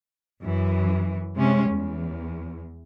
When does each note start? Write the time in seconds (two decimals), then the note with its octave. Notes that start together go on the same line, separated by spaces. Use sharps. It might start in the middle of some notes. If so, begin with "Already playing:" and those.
0.42 F#2 E3
1.37 C3 G3 G#3 C#4
1.70 E2